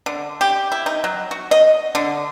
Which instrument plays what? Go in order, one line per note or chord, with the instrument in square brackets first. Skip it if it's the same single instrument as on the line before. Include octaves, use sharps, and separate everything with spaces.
[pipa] D3
G4
E4
D#4
F#3
F#4
D#5
D3